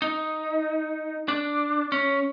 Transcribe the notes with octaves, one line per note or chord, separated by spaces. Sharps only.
D#4
D4
C#4